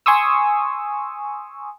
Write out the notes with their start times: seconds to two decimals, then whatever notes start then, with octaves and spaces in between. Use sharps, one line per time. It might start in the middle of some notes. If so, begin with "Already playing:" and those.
0.06 G#5 C6 C#6 D#6 E6